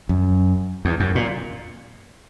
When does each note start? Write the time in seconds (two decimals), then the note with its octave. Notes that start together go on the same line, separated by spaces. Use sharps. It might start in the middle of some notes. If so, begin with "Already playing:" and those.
0.09 F#2
0.85 E2
1.00 F#2
1.15 A#2